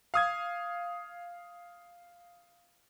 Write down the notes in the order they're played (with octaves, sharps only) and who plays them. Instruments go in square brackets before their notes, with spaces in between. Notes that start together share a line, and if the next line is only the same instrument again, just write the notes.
[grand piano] F5 D#6 G#6